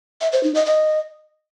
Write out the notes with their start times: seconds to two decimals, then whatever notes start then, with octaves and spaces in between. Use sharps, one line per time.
0.21 E5
0.32 C5
0.43 D#4
0.55 D#5
0.66 D#5